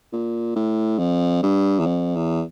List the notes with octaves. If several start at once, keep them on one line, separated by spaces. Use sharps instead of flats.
A#2
A2
F2
G2
E2
F2
E2